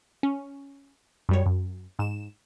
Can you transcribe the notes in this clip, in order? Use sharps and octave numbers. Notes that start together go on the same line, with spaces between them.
C#4
F#2 G3 C#5
F#2
G#2 E7